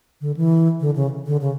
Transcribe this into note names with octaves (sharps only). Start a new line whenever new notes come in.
D3
E3
D3
C#3
D3
C#3